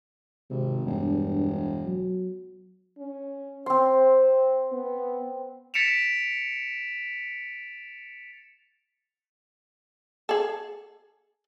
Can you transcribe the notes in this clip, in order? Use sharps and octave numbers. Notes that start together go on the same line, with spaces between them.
G#1 C3
E1 G2
F#3
C#4
C4 C5 C6
B3
A6 B6 C#7 D7 E7 F7
G#4 A4